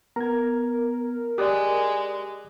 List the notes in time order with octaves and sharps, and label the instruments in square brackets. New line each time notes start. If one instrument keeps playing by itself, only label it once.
[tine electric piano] B3 [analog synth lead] A#4 [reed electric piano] A#5 G#6
[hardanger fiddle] G#3 [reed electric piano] G4 D5 [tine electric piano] D6 D#6 F#6